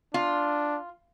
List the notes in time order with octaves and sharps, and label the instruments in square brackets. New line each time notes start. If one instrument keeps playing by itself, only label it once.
[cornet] D4 [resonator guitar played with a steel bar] F4